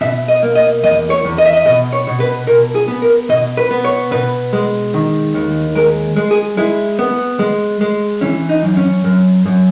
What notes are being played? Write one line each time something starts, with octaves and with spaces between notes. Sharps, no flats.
B2 E5
D#5
A#3
D#5
E2 D#5
C#5
E2
D#5
E5
D#5
B2 D#5
C#5
B2
B4
B2 A#4
G#4
B3
A#4
B2 D#5
B4
B3
C#5
B2 B4
G#3
D#3
D#2
G#3 A#4
G#3
G#4
G#3 E4
B3
G#3
G#3
E3 C#4
D#4
F#2
C#4
F#2
F#2